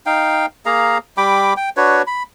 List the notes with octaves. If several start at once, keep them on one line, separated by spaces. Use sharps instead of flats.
D#4 F5 G5
A#3 G#4 F5 A#5
G3 G5 B5 D6
G5
D4 F#4 B4 C#5
B5